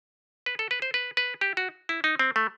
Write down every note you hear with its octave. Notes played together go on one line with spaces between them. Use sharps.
B4
A4
B4
C5
B4
B4
G4
F#4
E4
D#4
C4
A3